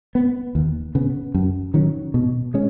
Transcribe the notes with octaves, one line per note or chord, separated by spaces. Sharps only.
B3
D#2
C#3 B3
F#2
D#3 F#3 C#4
B2
G#3 C#4